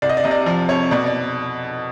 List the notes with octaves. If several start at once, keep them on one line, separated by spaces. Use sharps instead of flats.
C2 D5
D#5
D5
C3 D#5
D5
F3 D5
F2 C#5
B2 D5
D5